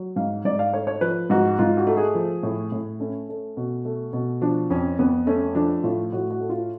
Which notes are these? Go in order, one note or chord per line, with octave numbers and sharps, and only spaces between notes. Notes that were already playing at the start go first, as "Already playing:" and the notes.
Already playing: F#3
G#2 F5
G#2 D5
F5
A3 C#5
C#5
F3 B4
G#2 F#4
G#2 F4
F#4
A3
G#4
F3
A2
A2
A3 C#4
A3
B2
A3
B2
F3 D4
F2 C#4
F2 B3
A3 C#4
F3 D4
A2 F4
A2 F#4
F#4
A3
F4